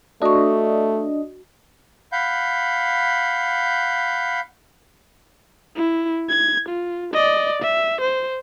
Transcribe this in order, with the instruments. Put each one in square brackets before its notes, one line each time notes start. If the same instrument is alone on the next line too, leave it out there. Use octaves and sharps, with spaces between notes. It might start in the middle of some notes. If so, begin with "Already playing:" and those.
[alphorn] A3 [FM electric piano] D4 D#5 [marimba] F#4 C#6
[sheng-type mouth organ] F5 F#5 B5 G6
[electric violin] E4
G#6
F4
D5 D#5
E5
C5